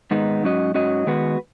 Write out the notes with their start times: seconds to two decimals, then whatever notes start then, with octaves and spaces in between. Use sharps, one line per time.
0.11 G#2 D#3 G#3 B3 D#4
0.43 G#2 F#3 C#4 F#4 D#5
0.74 G#2 F#3 C#4 F#4 D#5
1.07 D#3 G#3 B3 F#4 B4